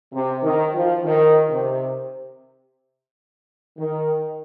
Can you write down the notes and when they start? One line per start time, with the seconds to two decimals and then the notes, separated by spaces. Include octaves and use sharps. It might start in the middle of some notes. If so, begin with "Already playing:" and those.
0.13 C3
0.43 D#3
0.74 F3
1.04 D#3
1.51 C3
3.78 D#3